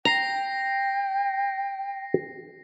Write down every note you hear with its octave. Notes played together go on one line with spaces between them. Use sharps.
G5 A#5 A#6 C7